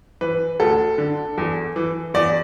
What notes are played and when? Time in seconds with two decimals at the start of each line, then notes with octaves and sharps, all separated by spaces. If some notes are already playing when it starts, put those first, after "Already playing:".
0.21 E3 B4
0.60 D2 A4
0.98 D3
1.38 E2
1.76 E3
2.14 E2 D5